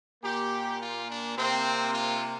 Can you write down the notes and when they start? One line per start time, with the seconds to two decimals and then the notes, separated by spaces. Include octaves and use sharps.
0.24 A#2 A#3 G4
0.80 F4
1.09 D4
1.37 C3 A#3 C4
1.93 F4